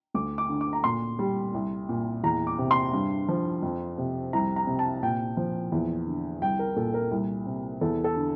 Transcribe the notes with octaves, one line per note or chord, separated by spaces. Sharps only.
D2 D6
D6
D3
D6
A#5
A#2 C6
G3
C2
A#2
E2 A#5
D6
C3
C6
G2
F3
F2
C3
C2 A#5
A#5
C3
A5
A#2 G5
F3
E2
D3
C2 G5
A#4
A#2 A4
A#4
C2
C3
E2 A4
A4
D3